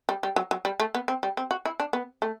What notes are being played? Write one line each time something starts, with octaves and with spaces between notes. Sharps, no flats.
G3
G3
F#3
F#3
G3
A3
B3
C4
G3
C4
F#4
E4
D4
B3
A3